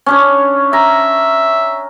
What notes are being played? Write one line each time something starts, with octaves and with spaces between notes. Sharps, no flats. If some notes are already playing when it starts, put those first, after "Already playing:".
C#4 D4 C#5
E5 A#5